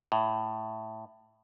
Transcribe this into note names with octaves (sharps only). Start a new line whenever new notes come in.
A2